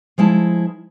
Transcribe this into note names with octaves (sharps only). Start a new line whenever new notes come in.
F3 G#3 E4 A5